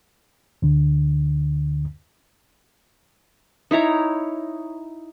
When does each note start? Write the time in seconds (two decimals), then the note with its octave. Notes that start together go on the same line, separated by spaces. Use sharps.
0.62 D2 D3
3.71 D#4 E4 C#5 A#5